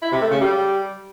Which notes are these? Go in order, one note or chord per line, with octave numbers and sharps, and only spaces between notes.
E4
C3
A3
C#3
G3